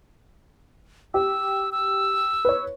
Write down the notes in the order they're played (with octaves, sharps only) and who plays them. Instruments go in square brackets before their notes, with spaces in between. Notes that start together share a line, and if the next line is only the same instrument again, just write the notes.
[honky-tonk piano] G4 [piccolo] E6
[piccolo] E6
[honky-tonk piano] B4 C#5